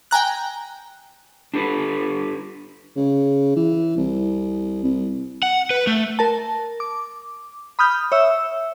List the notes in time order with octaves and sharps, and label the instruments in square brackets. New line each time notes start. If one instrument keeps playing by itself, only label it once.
[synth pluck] G5 G#5 A#5 F#6
[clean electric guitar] D4 G4 A4 B4
[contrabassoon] C#3
E3
C2
C2
[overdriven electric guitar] F#5
B4
A3
[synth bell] A#4 A5
D6
B5 D#6 F6 G6
C#5 E5 E6